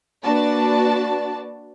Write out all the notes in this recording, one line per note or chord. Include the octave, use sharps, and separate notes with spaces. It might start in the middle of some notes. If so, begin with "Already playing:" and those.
A#3 D4 F#4 B4 D5 A5